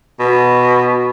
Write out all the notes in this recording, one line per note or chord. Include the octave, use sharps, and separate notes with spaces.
B2